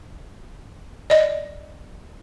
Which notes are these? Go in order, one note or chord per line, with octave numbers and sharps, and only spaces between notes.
D5 D#5